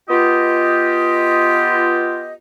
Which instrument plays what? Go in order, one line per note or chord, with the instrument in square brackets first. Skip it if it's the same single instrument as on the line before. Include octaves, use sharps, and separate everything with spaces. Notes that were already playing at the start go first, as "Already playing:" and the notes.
[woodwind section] B3 F4 G4 D#5